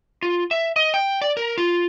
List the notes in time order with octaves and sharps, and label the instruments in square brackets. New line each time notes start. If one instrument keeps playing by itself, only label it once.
[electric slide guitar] F4
E5
D#5
G5
D5
A#4
F4